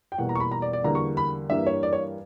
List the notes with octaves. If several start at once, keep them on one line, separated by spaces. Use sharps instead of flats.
G5
E2 B2 G3 A#3 F#5
A#5
C#6
B5
A#5
D5
D5
E2 D3 G3 A#3 A#5
C#6
B5
G2 E3 G3 A#3 E5
C#5
D5
C#5